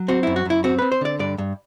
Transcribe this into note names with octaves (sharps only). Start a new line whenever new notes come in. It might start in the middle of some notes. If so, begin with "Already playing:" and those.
Already playing: F#3
C4 F#4
F#2 E4
F#4
F#2 E4
C4 F#4
C4 B4
C5
D3 D5
G2 D5
G2